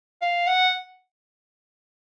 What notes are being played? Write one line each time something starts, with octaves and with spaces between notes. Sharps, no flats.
F5
F#5